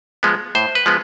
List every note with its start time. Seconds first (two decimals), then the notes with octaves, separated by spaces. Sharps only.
0.23 F3 G#3 B3
0.55 A2 C5
0.75 B4
0.86 F3 G#3 B3